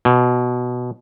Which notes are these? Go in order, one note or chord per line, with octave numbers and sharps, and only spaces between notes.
B2